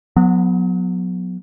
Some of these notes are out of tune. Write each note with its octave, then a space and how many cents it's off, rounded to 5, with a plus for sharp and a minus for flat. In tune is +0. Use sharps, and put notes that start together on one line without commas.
F#3 -30 B3 +0